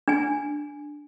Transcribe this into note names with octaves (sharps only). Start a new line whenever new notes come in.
D4 G#5